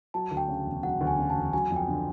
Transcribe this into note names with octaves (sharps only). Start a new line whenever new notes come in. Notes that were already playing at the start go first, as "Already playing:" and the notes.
F#3 A5
D2
G5
C#3
E1
F#3 F#5
D2
G#5
C#3
A5
E1
F#3 G#5
F2
G5
D3